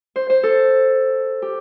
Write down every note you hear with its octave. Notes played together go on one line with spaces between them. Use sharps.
C5
C5
A4
G4